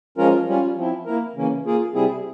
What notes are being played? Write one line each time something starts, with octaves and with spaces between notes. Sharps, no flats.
F3 G#3 C#4 F4 A#4
G3 C#4 F4
F3 C4 E4
A#3 E4 A#4
C#3 E3 A#3 C#4
A#3 F4 G#4
C3 G3 C4 E4 G#4